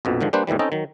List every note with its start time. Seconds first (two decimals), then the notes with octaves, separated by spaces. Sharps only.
0.05 A#1 F2 B2
0.21 G#2 D3 D#3 F3
0.33 G3 A#3 D4 B4 C5
0.47 E2 A2 D#3 E3 G3
0.59 C4 C#4 D#4 A4 D#5 G5
0.72 D#3 F#3